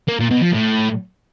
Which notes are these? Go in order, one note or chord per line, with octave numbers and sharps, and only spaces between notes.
A#3
A#2
B2
F3
A2